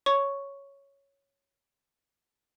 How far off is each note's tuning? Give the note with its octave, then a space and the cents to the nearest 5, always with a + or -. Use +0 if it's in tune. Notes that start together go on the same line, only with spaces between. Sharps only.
C#5 +0 C#6 +0